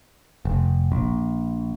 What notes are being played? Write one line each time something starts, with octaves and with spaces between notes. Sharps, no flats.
F1
A#1